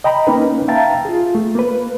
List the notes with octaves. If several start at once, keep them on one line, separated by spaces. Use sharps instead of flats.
D#5 G5 A#5 B5
A#3 C#4 D#4 B4
E5 F5 G5 A5 A#5 A6
F4 G#4
A3
A#3 B4